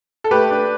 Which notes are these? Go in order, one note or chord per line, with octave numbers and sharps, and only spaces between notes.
A4
A3 G4 B4
D4